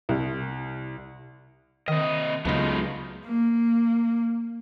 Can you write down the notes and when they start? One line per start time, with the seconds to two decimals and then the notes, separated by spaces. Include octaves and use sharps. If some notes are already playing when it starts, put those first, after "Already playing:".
0.09 C2
1.88 C3 D#3 D#5
2.45 C#2 C#3 F#3 G#3 A3 B3 D#4 F4
3.27 A#3